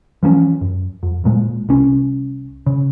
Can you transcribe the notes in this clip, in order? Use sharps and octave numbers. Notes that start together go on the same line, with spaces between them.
E3 F3 A3 C#4
F#2
F2
D1 A#2 G#3
C2 C#4
C#3